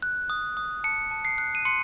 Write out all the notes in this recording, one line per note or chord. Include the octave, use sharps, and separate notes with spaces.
F#6
D#6
D#6
A5 C#7
A5
C7
F#6
D#7
C6 C#7